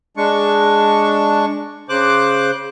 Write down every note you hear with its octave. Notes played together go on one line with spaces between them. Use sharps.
G#3 D4 C#6
C#3 C5 D6 F#6